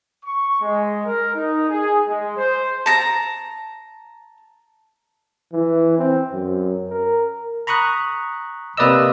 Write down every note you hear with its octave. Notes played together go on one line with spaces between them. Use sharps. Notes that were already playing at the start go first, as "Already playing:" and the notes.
C#6
G#3
A#4
D#4
G#4
G#3
C5
A5 A#5
E3
C4
F#2
A#4
A#5 B5 C#6 D#6 F#6
C3 A#3 B4 D5 D#5 E6